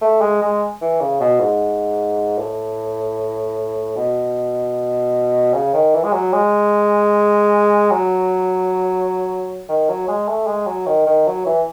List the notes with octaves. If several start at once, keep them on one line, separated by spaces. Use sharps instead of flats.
A3
G#3
G#3
E3
C#3
B2
G#2
A2
B2
C#3
D#3
E3
G#3
F#3
G#3
F#3
D#3
F#3
G#3
A3
G#3
F#3
D#3
D#3
F#3
E3